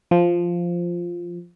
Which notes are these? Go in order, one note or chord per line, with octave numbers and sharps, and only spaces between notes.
F3